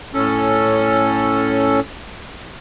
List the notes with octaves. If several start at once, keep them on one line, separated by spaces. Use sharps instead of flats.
A2 C#4 A4